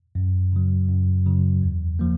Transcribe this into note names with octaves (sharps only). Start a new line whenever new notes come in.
F#2
C#3 F#3
F#2
C#3 F#3
E2
F3 A#3